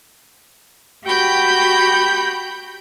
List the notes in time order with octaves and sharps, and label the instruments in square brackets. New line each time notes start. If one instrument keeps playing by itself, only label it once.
[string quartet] F#4 G4 G5 B5 G6